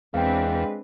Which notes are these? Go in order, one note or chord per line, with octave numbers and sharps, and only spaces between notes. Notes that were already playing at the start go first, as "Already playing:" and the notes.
E2 G#3 C4 D4 B4 F5 G5